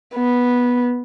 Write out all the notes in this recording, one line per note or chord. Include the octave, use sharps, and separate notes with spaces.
B3